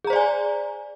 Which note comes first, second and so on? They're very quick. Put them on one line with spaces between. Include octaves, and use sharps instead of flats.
G#4 A#5 C5 D5 G#5